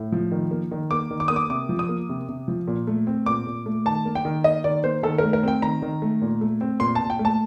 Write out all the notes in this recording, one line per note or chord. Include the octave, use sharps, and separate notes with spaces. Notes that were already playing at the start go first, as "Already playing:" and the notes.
Already playing: A2
F3
D#3
A#3
D#3
A#3 D6
D#3
D6
A#3 D#6
D6
C3 D6
F3
D#6
A#3
C3
C3
F3
A#2
A3
C4
A#2 D6
A#2
A3
D#3 A5
A#3
G5
D#3
A#3 D#5
D#3 D5
A#3 C5
D#3 A4
A3 A#4
A#4
C4 G5
D#3 A#5
D#3
A3
A#2
A3
C4
A#2 C6
A#2 A5
G5
A3
A5